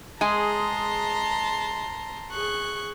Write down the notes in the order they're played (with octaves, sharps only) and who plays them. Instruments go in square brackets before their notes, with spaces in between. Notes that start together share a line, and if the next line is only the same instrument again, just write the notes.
[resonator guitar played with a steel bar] G#3 G#4 [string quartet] A5 A#5 C6
[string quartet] G#4 C#6 F#6